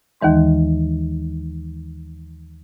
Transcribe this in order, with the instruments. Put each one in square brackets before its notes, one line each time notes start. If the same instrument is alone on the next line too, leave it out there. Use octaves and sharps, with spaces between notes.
[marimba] D#2 D#3 E3 G#3 C6